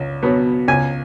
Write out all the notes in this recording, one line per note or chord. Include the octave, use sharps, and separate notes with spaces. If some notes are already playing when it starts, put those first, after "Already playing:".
Already playing: C#2
B2 F#3 B3
C#2 G#5